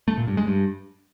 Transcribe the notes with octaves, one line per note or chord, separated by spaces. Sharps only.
A3
A#2
G2
G#3
G2